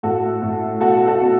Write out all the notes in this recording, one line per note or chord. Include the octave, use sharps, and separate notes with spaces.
A2 F#4 A4
A2
B2 F#4 A4
F#4 A4
B2